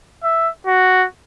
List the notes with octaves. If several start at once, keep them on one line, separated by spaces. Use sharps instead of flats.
E5
F#4